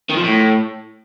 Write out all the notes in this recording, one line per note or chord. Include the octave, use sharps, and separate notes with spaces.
D#3
F3
A2